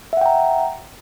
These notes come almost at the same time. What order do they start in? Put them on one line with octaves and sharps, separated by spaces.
E5 F#5 G5 A#5